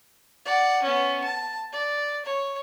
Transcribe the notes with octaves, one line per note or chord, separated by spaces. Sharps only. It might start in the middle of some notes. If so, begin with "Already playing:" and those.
D5 F#5
B3 C#4
A5
D5
C#5